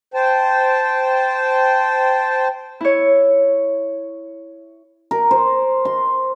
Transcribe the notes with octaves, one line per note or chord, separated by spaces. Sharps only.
C5 G5 A5
E4 C#5
A#4
C5
C6